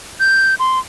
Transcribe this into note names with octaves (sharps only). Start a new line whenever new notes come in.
G6
C6